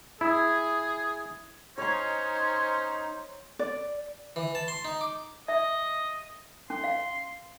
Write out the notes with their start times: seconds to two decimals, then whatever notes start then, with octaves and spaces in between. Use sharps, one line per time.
0.21 E4 G#4
1.78 C#4 D#4 C5 C#5 C6
3.59 D5
4.36 E3
4.55 A5
4.68 C6
4.85 D#4
5.01 D6
5.48 D#5 E5
6.70 C#4 C6
6.84 F5